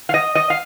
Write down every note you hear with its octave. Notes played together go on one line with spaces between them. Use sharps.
F5
D#5
D#5
F5